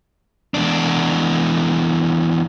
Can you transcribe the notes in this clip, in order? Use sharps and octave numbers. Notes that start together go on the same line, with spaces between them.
E2 D4